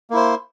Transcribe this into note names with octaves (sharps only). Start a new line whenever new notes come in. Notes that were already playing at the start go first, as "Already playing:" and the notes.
A#3 E4 C5